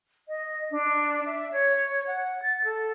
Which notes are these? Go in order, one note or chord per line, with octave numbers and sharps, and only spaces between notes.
D#5
D4
E5
C#5
F#5
A6
A4